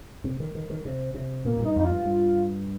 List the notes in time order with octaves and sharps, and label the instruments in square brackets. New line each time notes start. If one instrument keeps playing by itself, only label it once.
[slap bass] C3
D#3
D#3
D#3
C3
C3
[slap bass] A#2 [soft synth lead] A#3
[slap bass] A#2
G2
[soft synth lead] D#4
[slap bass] F2 [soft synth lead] D#4
[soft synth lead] F4
[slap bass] G2
G2